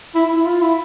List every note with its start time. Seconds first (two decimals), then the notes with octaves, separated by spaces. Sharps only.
0.15 E4
0.25 E4
0.36 E4
0.46 F4
0.61 E4